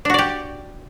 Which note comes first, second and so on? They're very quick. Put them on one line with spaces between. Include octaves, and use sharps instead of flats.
D4 F#4 D5 G4